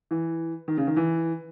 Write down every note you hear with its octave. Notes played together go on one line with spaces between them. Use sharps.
E3
D#3
C#3
D#3
E3